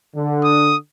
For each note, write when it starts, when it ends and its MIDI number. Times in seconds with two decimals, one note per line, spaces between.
0.15 0.76 50
0.44 0.76 87